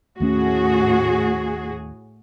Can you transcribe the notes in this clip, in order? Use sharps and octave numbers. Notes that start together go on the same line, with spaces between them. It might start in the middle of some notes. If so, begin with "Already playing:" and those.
D#2 A2 A3 C#4 F#4 G#4